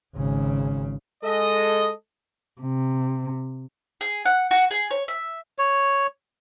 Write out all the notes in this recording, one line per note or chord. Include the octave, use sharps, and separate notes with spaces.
G#1 C#3
G#3 A4 D#5
C3
G#4
F#5
F#4
G#4
C#5
E5
C#5